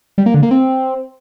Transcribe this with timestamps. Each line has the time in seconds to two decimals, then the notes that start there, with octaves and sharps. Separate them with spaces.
0.18 G3
0.26 A#3
0.34 D3
0.43 A#3
0.51 C4